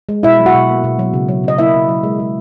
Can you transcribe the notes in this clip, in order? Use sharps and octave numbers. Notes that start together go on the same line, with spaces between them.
G#3
B2 E4 E5
F#3
F#4 F#5
B2
A#3
B2
F#3
C#3
F#3
C#3 D#5
A#3 E4 E5
C#3
F#3
G#3
G#3